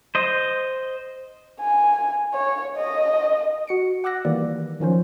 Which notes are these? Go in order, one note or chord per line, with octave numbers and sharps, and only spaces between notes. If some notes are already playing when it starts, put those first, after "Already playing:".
C5 D#5
G#5
C#5
D#5
F#4 C#7 D7
F#5 D6 E6 F#6 A#6
D#3 E3 G3 A#3 D5
D#3 F3 C#4 C5